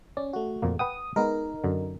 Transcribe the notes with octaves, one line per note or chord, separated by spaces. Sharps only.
C#4 D5
A3 F#4
F2 A#2 A#3
B4 F#5 G5 D#6
G#3 B3 D#4 A#4
F#2 D3